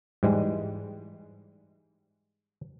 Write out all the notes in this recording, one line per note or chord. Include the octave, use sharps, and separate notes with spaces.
G#2 E3 G3 G#3